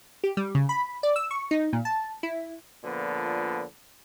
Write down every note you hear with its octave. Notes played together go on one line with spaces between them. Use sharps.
G4
G3
C#3
B5
D5
E6
C#6
D#4
A#2
A5
E4
A#2 D3 F3 B3